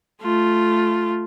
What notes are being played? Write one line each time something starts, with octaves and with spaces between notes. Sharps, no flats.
A3 F4